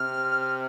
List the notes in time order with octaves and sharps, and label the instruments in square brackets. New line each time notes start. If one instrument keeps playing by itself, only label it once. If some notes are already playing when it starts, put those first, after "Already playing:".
Already playing: [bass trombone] C3 [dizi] F6